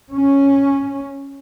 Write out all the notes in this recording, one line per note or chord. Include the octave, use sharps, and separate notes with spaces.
C#4